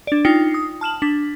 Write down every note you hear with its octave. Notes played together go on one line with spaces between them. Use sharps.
D4 D5
D#4 F4 G5 C7 C#7
D#6
A5 F6 E7 F#7
D4 B6